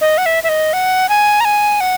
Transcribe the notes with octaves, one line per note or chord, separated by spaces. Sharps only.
D#5
F#5
E5
E5
D#5
F#5
G#5
A#5
G#5
F#5